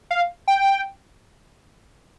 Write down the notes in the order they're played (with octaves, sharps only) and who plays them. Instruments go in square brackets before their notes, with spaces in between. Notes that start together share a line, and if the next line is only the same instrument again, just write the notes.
[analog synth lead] F5
G5